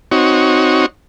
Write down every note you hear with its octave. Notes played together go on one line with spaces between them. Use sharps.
C4 D#4 F#4 C#5